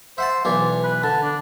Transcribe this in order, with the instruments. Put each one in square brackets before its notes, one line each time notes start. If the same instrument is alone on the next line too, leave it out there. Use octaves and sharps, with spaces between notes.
[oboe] C5 [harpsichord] E5 F#5 A5
[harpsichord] B1 E3 [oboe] D5
[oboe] B4
[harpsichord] D3 [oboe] A5
[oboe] D4